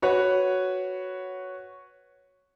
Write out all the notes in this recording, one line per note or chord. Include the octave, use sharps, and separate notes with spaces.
F#4 B4 C#5 F#5